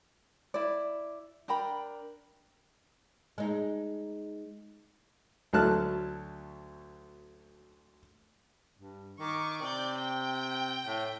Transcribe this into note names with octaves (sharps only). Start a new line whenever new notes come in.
E4 D5
D4 A#4 G5 B5
G#3 D#4
D2 F#3 A4 A5 F6 F#6
G2
D#3 C#6 D6
C3 D5 G6
G5
A2